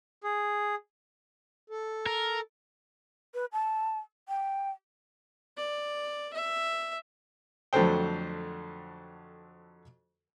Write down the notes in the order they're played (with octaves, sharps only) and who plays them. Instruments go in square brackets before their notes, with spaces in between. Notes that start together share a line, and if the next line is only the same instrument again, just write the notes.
[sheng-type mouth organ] G#4
[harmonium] A4
[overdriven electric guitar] A#4
[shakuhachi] B4
A5
G5
[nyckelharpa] D5
E5
[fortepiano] F2 D3 F#3 A3 C5 G5